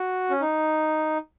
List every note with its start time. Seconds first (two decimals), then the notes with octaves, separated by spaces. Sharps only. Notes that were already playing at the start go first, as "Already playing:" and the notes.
Already playing: F#4
0.30 C#4
0.41 D#4